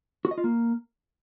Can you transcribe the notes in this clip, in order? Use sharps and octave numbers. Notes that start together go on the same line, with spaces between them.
F#4
D#5
F4
A#3